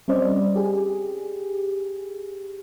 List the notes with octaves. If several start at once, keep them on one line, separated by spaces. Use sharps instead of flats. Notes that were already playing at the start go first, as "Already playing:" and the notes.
G3 C4 C#4 C5 D5 D#5
G4 G#4